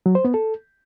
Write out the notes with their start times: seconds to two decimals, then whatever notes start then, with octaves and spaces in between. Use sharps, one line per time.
0.06 F#3
0.15 C5
0.25 B3
0.34 A4